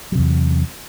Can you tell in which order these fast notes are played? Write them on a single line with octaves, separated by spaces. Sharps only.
F#3 C3 E2